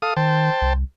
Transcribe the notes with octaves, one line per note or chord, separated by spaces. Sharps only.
A4 F5 D#6
D#3 C5 G5 A5
C2